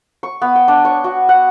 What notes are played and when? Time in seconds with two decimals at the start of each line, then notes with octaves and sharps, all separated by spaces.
0.23 C#6
0.42 B3
0.56 G5
0.68 D4
0.85 C#5
1.04 F#4
1.29 F#5